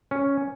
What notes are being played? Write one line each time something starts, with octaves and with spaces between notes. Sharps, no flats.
C#4